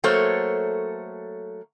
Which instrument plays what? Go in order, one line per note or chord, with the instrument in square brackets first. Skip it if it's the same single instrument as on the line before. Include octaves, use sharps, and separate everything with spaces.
[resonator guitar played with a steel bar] F#3 A3 A#3 A4 C5 C#5